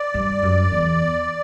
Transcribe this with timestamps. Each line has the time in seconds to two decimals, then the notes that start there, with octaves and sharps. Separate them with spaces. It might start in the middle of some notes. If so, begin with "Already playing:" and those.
Already playing: D5
0.14 G2
0.43 F#2
0.72 E2